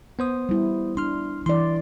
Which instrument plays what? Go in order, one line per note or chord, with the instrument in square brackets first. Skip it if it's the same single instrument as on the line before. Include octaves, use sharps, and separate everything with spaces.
[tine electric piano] B3 C5 D#6
[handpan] G3 E4
[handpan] D4 [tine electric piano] C6 F6
[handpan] E3 E4 D5 [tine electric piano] C6